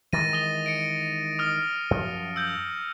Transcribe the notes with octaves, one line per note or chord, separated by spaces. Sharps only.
D#3 E3 G#3 A6 A#6 D#7
D#6 A6 G7
C#7 D7
D#6 F6
F#2 F3
E6 G6